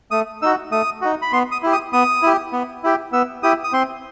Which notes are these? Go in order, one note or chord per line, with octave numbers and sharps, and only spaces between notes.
A3 D#6
D#4 F#4 E6
A3 D#6
D#4 F#4
B5
B3 C6
D#6
E4 G4
D#6
B3 D#6
E4 G4
B3
E4 G4
B3 E6
E4 G4 D#6
D#6
C4 C6